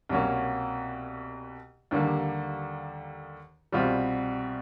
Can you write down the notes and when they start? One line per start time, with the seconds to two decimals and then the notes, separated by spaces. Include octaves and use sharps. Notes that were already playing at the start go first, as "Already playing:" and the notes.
0.09 C2 B2 F#3 A#3 C#4
1.91 D#2 D3 G3 A#3
3.72 C2 B2 G3 C4 F4